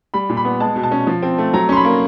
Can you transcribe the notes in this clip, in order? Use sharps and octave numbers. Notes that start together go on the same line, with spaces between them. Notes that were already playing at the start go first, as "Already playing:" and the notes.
G3 B5
A#2
B5
B3
G#3 A5
B2
A5
C#4
F3
C4
A3
F#3 A#5
C#4 C6
B5
A#3